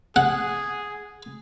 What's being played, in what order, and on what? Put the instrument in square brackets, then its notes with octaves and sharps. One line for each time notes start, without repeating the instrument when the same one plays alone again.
[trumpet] G#4 [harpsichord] F#5